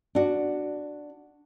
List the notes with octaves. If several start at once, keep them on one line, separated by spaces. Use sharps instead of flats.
D4 F#4